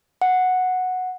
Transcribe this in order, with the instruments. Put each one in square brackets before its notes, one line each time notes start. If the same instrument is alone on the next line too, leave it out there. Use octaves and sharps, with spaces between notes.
[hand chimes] F#5